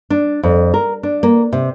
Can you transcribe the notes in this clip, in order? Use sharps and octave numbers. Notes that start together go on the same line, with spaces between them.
D4
F2
A#4
D4
A#3
C3